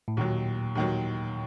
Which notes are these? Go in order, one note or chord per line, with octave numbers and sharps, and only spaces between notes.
A2
D#2 A#2 D#3 F#3
D#2 D#3 F#3